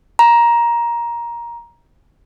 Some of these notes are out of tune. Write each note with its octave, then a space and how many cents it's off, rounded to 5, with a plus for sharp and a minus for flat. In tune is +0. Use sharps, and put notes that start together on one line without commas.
A#5 +15